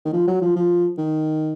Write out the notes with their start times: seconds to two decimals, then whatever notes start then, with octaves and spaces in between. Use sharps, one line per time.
0.06 D#3
0.13 F3
0.27 F#3
0.42 F3
0.56 F3
0.98 D#3